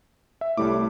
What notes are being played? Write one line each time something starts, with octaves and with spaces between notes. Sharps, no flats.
E5
C2 A2 G3 D6